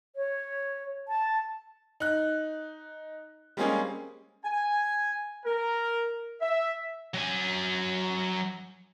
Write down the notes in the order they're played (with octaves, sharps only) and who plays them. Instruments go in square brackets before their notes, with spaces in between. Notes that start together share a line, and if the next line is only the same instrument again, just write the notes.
[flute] C#5
A5
[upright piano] D#4 F#6
G3 G#3 A#3 C4 C#4 G#4
[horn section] G#5
A#4
E5
[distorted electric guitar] F#3 G#5